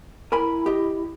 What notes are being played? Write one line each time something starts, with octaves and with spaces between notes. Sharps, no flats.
E4 A#4 G#5 B5
G4 D#5